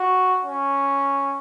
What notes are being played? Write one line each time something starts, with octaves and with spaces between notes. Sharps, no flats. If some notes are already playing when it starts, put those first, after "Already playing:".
Already playing: F#4
C#4